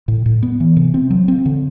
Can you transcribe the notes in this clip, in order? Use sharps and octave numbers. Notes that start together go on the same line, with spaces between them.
A2
A2
B3
E3
C3
C4
F#3
C4
D3